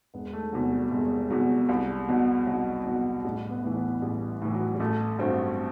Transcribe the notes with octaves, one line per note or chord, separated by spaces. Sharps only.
E1 B3
A3
E2 C3 F#3
G3
E1
E2 C3 F#3
C2 G3
B2 F#3
C2 F#3
B2 F#3
A1 G3
B3
A2 E3
B3
A1 G3
A2 E3
F#3
G3
A1 A3
G2 F#3 C4